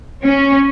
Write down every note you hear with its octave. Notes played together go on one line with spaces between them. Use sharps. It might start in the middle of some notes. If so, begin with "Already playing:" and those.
C#4